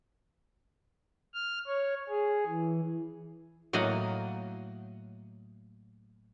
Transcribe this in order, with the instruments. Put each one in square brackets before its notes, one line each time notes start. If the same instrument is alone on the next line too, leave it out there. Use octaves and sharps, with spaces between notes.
[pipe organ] F6
C#5
G#4
E3
[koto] A2 F#3 A#3 D#5 F5 F#5